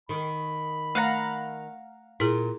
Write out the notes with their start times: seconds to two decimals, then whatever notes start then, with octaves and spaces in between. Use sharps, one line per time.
0.09 D#3 B5
0.95 A3 F5 F#5 A#5
2.20 A#2 E4 G#4